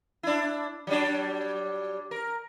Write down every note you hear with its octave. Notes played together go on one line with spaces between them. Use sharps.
D4 E4
F#3 G3 D4
A#4